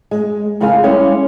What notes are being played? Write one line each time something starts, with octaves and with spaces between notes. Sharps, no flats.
G#3
F2 C#3 G#3 G#4 F5 G#5
G3 G#3 C#4 E4 G#4 C#5